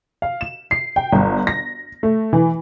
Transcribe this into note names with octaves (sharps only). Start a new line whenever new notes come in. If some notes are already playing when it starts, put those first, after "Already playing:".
F5
E7
C7
G5
G1
A#6
A3
E3